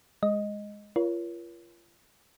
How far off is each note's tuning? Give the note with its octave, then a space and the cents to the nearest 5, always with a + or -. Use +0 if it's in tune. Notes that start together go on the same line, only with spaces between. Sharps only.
G#3 +0 D#5 +0
F4 -30 A#4 +40 C#5 +20